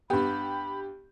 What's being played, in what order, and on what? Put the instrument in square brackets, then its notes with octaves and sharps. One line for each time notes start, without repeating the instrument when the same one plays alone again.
[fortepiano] G2 B3 [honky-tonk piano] G4 [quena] B5